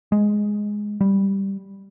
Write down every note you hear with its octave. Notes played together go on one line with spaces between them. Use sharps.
G#3
G3